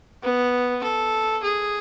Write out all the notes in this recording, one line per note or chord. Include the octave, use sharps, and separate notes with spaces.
B3
A4
G#4